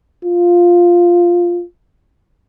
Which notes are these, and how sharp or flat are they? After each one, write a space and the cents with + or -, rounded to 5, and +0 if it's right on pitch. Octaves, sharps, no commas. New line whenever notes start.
F4 +0